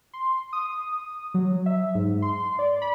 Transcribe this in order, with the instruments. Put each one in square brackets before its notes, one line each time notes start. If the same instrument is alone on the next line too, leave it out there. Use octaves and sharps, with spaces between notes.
[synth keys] C6
D#6
F#3
E5
G#2
C6
D5
B5